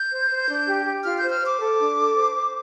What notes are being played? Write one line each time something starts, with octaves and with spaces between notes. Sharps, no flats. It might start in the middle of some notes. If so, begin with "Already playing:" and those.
Already playing: G6
C5
C5
D4
G4
G4
F4 F6
C5 G6
F6
C5
D6
A4
D4
A4
C5
C5